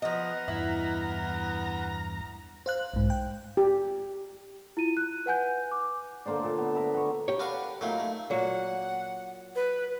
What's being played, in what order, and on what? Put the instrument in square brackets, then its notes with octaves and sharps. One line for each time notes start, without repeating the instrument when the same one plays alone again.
[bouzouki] F3 D#5 [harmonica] B3 F#5 F6 [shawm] A#5
[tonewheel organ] E2 G2 [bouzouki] E4
[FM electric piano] C5 F5 F#6
B1 G#2
G5
[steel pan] G4
[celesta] E4 F4 D#7
F#6
B4 F#5 G#5 G6
D6
[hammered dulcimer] D3 A#3 C5 D5
A#2 A5
B3
A#4 E5 A#5
B3 C#6
[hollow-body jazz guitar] G4 C#5
[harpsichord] D4 F5 C#6 [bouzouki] A#4 B4 F#5
[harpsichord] A#2 F#3 A3 [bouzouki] A#3 D#4 F5
[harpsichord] A3
[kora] A#2 F#3 A#3 [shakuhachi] F#5
[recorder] B4